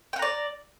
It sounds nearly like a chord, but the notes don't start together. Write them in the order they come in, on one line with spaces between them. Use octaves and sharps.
G5 F#5 A#5 D5